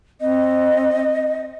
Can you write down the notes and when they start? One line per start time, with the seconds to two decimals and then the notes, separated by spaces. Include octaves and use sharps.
0.21 C4 D#5